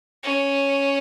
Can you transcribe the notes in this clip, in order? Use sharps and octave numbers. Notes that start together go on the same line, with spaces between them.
C#4